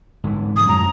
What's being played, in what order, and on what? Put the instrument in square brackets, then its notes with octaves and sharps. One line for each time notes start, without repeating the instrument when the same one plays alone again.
[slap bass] G#2 D3 E3
[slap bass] G#2 F3 [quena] D#6
[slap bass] F#2 A2 [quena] A#5